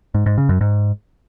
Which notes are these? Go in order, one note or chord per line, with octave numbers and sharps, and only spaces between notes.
G#2
G#2
C#3
F#2
G#2